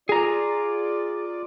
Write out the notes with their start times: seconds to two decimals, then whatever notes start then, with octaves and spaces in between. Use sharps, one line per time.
0.09 F4 G#4 D5 A#5